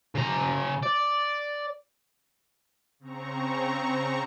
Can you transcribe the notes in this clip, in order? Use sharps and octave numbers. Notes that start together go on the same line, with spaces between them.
C#3 A#5
D5
C#3 C4 A#5 C#6